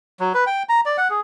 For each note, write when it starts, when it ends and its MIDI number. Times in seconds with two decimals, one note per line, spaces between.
0.20 0.33 54
0.34 0.44 71
0.47 0.63 79
0.69 0.81 82
0.86 0.97 74
0.98 1.08 78
1.10 1.21 68